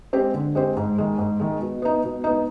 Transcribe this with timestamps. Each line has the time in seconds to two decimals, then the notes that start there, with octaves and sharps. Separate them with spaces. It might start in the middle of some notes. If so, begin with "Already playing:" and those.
0.13 G#3 C4 G4 C5
0.34 D3
0.55 G#3 C4 G4 C5
0.77 G#2
0.98 D#3 G#3
1.18 G#2
1.40 D#3 G#3
1.61 B2
1.82 B3 D#4
2.04 B2
2.24 B3 D#4